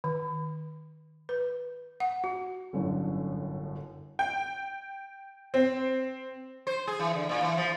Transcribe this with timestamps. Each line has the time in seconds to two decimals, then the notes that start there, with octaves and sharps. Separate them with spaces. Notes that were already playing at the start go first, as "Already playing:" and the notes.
0.04 D#3
1.29 B4
2.00 F#5
2.24 F#4
2.73 G1 F#2 A2 D3
4.19 G5
5.54 C4
6.67 C5
6.87 G#4
6.99 E3
7.14 D3
7.29 A#2
7.42 E3
7.57 F3